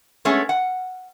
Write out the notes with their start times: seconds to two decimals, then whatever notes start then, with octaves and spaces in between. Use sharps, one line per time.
0.25 G#3 A3 B3 C#4 G#4
0.49 F#5